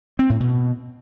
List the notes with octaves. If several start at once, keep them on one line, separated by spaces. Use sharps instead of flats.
C4
A2
B2